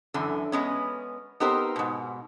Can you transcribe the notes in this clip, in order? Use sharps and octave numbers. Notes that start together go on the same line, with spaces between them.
F#2 D3 E3
G#3 B3 C#4
B3 C4 D#4 G4 A#4 C5
G#2 B2